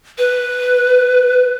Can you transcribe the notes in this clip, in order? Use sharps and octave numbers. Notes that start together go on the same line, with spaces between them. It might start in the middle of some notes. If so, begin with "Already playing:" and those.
B4